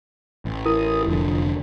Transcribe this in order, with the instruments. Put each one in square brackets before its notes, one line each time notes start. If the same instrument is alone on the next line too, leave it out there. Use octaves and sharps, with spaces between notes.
[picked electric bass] A1
[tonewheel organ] E4 A#4 D#6
[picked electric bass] F1 D3 [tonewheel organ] F3